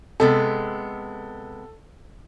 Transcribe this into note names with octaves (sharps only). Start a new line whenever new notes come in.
C3 G#3 B3 A4